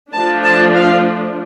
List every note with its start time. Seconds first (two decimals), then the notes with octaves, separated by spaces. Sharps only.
0.13 F3 A3 D4 A5
0.44 A5
0.75 F5